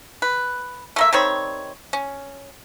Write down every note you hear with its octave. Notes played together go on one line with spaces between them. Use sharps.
B4
A3 A#3 E5
D#3 G3 C4 C#5
C#4